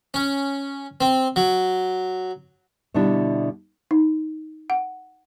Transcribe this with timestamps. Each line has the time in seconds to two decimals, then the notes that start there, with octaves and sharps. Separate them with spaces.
0.14 C#4
1.01 C4
1.36 F#3
2.94 B2 D3 G3 D4 E4
3.91 D#4
4.70 F#5